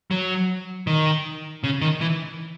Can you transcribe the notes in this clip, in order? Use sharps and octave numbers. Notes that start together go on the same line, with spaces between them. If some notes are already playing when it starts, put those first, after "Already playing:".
F#3
D#3
C#3
D#3
E3